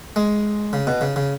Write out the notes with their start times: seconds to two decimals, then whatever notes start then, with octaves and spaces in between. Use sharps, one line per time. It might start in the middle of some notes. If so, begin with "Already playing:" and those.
0.16 G#3
0.73 C#3
0.87 B2
1.01 C#3
1.16 C#3